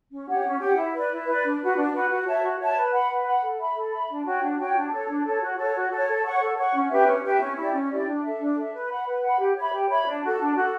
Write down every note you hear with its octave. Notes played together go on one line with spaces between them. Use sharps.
C#4
G4 C#5 F#5
C#4
G4 C#5 F#5
E4
B4 D5
E4
B4 D5
D4
F#4 B4
D4
F#4 B4
F#4
C#5 E5 A5
F#4
C#5 E5 A5
B4
F#5 B5
B4
F#5 B5
A4
E5 B5
A4
E5 B5
D4
F#4 C#5 G5
D4
F#4 C#5 G5
D4
A4 C#5
D4
A4 C#5
F#4
A4 C#5
F#4
A4 C#5
A4
C#5 F#5 C#6
A4
C#5 F#5 C#6
C#4
G4 B4 E5
C#4
G4 B4 E5
C#4
E4 G4 D5
C#4
E4 G4 D5
D4
A4 E5
D4
A4 E5
B4
F#5 B5
B4
F#5 B5
G4
C#5 E5 B5
G4
C#5 E5 B5
D4
F#4 A4
D4
F#4 A4